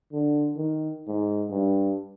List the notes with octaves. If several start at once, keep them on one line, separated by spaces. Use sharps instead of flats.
D3
D#3
G#2
G2